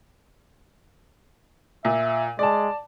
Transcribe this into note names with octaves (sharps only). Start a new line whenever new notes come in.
A#2 E5
G#3 D5 A5